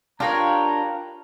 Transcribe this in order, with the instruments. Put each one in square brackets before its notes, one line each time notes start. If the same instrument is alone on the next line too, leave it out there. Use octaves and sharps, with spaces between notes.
[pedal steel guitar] D4 G4 C#5 [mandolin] F4 A#4 B4 [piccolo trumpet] A#5